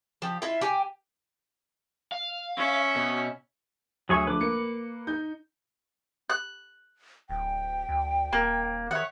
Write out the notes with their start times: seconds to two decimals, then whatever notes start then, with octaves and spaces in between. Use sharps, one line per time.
0.22 F3 G4
0.42 E4 F4 E5
0.61 G4 G5 G#5
2.12 F5
2.57 C#4 E5
2.96 B2
4.09 D2 F#3 G#4 E5 C#6
4.27 D3 F3 A3 B4 D6
4.40 A#3 C#7
5.07 D#4 G6
6.30 F#6
7.30 D1 G5
7.89 D2
8.33 D#1 A#3
8.91 D#3 C#5 E5 F#5